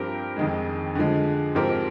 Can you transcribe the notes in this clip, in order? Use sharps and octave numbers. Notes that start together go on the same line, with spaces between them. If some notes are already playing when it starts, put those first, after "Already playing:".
Already playing: G2 F3 C4 G4 A#4
F2 D#3 G#3
D3 F3 G#3
G#2 F3 C4 G4 A#4